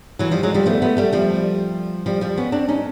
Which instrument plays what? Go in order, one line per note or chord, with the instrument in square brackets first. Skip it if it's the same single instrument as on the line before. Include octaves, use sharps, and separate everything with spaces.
[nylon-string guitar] E3 F#3
F3 G3
F#3 G#3
F3 G3
A3 B3
A3 B3
G3 A3
F3 G3
F3 G3
F3 G3
B3 C#4
C4 D4
C#4 D#4